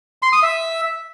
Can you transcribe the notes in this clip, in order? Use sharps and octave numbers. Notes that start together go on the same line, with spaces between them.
C6
D#6
E5